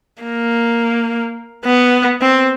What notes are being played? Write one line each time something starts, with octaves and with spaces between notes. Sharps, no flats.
A#3
B3
C4